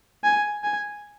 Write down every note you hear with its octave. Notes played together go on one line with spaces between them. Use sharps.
G#5
G#5